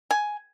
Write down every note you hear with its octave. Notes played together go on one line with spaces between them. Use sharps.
G#5